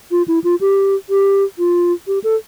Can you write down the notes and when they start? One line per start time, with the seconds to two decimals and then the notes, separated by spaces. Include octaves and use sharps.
0.11 F4
0.28 E4
0.44 F4
0.61 G4
1.09 G4
1.59 F4
2.07 G4
2.24 A4